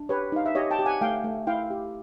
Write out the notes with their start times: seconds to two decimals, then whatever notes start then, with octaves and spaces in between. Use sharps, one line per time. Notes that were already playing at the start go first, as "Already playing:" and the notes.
Already playing: D4
0.09 G4 B4 C#5
0.32 D#4 F5
0.46 E5
0.55 G4 C#5 D#5
0.71 G5 A5
0.79 G4
0.86 F#5 G#5
1.01 A3 F5 G5
1.24 A3
1.47 E4 F5 G5
1.70 G4